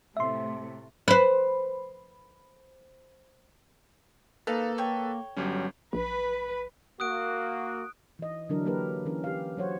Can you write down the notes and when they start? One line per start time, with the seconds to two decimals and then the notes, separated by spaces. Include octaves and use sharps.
0.17 A2 C3 A3 E5 C6
1.08 B4 C5
4.47 A#3 D#4 A4 B4 F5
4.78 C#5 G5
5.36 G1 F#3 G3 C#4
5.93 A#1 B4
7.00 A#3 F#4 D#6 F#6 D7
8.19 E3 D#5
8.49 D3 E3 F#3 D4 E4 A#4
8.65 F#3 A#3 G4 A#4 B4
9.06 E3 C#4 A#4
9.24 G4 F5
9.57 F#3 C5 C#5 F#5